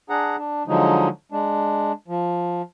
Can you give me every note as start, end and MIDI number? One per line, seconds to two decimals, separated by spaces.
0.10 0.36 62
0.10 0.36 68
0.10 0.36 78
0.10 0.36 82
0.38 0.63 62
0.68 1.08 50
0.68 1.08 53
0.68 1.08 54
0.68 1.08 56
0.68 1.08 63
1.32 1.92 56
1.32 1.92 62
2.08 2.62 53